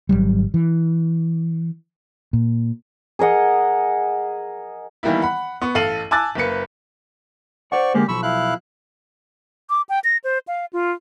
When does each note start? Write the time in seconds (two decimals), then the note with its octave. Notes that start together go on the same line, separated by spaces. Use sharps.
0.09 G#1 D#2 F#3 G3
0.54 E3
2.33 A#2
3.19 G#4 A#4 D#5 F#5
5.03 D#3 E3 G3 A#3 B3 E4
5.22 F#5 B5
5.62 B3 C#6
5.75 A1 A4 F5 D#7 F#7
6.11 G#5 A5 D6 E6 F#6 A6
6.35 F#1 A#3 B4 C#7
7.72 C5 D5 F#5 C#6
7.94 D3 G#3 A#3 G4
8.08 B1 F3 B5 C#6 E6
8.23 E4 F5 F#6
9.70 D6
9.89 G5
10.04 A#6
10.24 C5
10.48 F5
10.73 F4